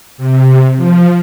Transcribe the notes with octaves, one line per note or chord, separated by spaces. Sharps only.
C3
F3